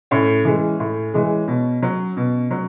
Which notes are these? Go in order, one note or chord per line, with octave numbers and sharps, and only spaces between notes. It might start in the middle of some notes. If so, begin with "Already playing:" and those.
A2 C#4
E3 G#3
A2
E3 G#3
B2
F#3
B2
F#3